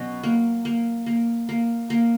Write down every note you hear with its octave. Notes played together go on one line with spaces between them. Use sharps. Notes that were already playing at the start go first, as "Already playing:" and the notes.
Already playing: B2 F#3 C#4
A#3
A#3
A#3
A#3
A#3